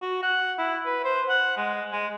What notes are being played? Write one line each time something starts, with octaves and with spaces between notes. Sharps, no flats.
F#4
F#5
E4
B4
C5
F#5
G#3
G#3